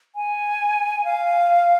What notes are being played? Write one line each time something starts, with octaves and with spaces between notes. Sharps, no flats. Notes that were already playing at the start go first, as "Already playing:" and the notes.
G#5
F5